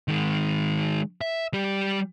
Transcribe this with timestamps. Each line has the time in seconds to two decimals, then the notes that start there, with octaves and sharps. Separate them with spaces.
0.08 D#3 G#3
1.21 E5
1.53 G3 G4